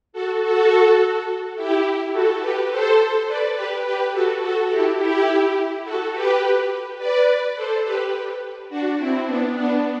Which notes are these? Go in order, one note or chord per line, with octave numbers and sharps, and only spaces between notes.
F#4 A4
F#4 A4
E4 G4
F#4 A4
G4 B4
A4 C5
B4 D5
G4 B4
G4 B4
F#4 A4
F#4 A4
E4 G4
E4 G4
F#4 A4
G4 B4
B4 D5
A4 C5
G4 B4
D4 F#4
C4 E4
B3 D4
B3 D4